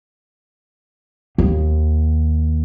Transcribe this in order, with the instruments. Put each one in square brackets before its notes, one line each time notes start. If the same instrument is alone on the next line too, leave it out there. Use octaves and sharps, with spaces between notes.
[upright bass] D#2